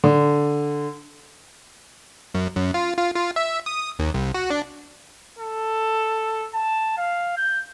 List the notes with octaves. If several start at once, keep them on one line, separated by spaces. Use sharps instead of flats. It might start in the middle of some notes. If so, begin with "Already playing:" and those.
D3
F#2
F#2
F4
F4
F4
E5
D#6
D#2
C2
F#4
D4
A4
A5
F5
G6